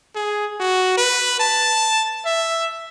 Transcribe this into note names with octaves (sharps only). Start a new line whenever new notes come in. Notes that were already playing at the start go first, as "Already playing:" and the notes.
G#4
F#4
B4
A5
E5